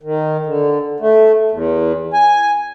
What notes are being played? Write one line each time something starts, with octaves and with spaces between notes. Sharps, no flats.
D#3
D3
A3
E2
G#5